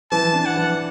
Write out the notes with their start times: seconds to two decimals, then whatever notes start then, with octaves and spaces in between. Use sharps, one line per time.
0.12 E3 A5
0.33 D4
0.46 F#5
0.56 E3